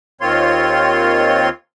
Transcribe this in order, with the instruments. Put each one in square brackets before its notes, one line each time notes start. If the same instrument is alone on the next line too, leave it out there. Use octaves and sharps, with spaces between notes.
[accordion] D#2 D#3 C4 F4 C#5 C6